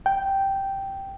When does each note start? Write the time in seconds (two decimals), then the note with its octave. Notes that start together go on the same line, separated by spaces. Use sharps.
0.06 G5